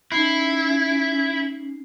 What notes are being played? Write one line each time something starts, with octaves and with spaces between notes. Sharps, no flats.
C#4 D#4 E4 C7